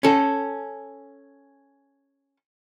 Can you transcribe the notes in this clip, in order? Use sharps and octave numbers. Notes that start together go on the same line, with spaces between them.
C#4 A4